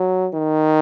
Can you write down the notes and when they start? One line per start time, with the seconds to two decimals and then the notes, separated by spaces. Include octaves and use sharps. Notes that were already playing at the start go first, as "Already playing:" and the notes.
Already playing: F#3
0.34 D#3